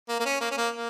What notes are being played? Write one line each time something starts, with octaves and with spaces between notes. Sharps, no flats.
A#3
A#3
C#4
A#3
C#4
A#3
A#3